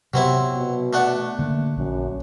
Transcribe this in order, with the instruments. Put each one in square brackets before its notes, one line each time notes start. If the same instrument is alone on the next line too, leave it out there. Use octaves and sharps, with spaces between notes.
[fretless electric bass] C3 B3 [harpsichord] F#3 C4 E4 [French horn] G4
[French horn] B2
[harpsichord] A3 D4 F#5
[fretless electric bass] D3 A#3
[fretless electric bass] A#1 [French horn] F#2